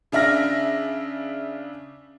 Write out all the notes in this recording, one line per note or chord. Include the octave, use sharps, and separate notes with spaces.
C#3 D4 E5 F6 A#6